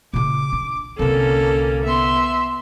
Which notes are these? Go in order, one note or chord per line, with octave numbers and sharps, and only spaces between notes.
A#2 C#3 D6
D4
C2 D3 A#3 C#4 A4
B3 E5 C6